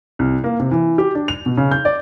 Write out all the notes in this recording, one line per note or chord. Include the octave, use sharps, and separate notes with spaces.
C2
A#3
C3
E3
G4
D4
F7
B2
C#3
G6
D5